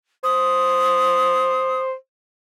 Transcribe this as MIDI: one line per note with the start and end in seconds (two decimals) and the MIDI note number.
0.24 1.94 72
0.24 1.82 87